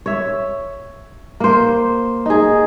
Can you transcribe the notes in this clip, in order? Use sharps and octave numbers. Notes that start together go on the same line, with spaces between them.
C#5 E5
A#3 C5
D#4 G#4